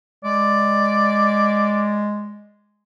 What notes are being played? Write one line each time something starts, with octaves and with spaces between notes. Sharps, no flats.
G#3 D5